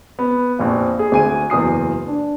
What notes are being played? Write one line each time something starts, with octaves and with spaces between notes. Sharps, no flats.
B3
A#1 F2 F4
G#4
D2 G#5 D#7
F#1 E2 D#6 C7
D4